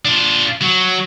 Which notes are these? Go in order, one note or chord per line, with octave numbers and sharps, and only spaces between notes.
D4 F4
F#3